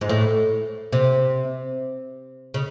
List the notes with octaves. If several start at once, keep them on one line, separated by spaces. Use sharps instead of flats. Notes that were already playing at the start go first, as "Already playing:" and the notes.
G#2
A2
C3
C#3